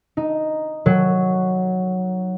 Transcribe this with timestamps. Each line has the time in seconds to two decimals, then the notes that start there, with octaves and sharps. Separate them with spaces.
0.17 D#4
0.86 F#3